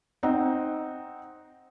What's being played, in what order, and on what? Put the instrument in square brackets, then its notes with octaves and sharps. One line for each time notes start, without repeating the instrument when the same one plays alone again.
[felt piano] C4 D#4 F#5